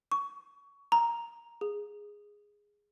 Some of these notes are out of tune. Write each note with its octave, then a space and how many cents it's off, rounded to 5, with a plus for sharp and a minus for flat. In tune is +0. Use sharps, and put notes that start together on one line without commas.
C#6 +20
A#5 +5
G#4 -5